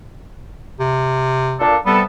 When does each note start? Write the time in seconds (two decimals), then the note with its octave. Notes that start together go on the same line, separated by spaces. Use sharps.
0.80 C3
1.60 A#2 D4 A4
1.86 C3 G3 B3 A4